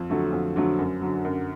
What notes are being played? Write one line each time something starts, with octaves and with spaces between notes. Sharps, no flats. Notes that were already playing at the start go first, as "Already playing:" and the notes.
Already playing: F2
D3 F#3 A3
F2
D3 F#3 A3
F#2
D3 F#3
F#2